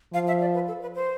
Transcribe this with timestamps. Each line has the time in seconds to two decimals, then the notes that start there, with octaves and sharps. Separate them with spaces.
0.13 F3 F5
0.27 E5
0.41 D5
0.54 B4
0.68 A4
0.82 B4
0.95 C5